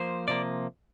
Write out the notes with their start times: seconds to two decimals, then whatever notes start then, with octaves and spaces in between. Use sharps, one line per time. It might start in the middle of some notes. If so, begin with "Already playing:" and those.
Already playing: F3 A#3 C5
0.28 C3 F3 A#3 D5